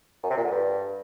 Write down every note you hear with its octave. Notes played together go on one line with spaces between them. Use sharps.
F#2
C3
A#2
D3
G2